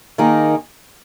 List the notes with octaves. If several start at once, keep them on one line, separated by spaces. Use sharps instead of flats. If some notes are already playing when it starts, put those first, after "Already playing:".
D#3 A#3 D#4 G#4